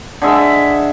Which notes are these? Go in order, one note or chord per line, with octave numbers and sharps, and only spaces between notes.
D3 G#3 E5